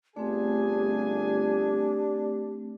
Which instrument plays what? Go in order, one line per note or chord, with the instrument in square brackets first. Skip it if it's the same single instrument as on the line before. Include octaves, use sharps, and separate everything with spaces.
[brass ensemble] G1 G#4 G#5 [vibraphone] A3 C4 [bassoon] D4 [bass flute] G4